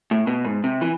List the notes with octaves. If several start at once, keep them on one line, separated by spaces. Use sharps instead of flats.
A2
B2
G#2
C3
E3